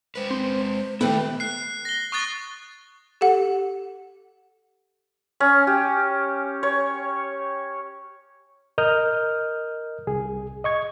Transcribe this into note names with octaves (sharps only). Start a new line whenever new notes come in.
G#3 B4 C5
C4
D#3 A3 B3 E4 G4 B4
F#6 C7
A#6 G7
C#6 D#6 F#6 A6 G7
G4 A4 F#5
C#4
G4
C#5
A#4 D#5 D#6 F6 G6
C2 G#4
D#5 C#6 G#6